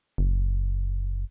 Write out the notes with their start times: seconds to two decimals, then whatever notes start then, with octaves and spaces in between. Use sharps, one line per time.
0.18 F#1